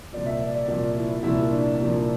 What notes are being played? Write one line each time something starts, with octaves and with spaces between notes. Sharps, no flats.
C2 A#2 F3 D5
E5
D5
D5
C2 A#2 F3 D5
E4
C2 A#2 F3 E4
D4
C2 A#2 F3 D4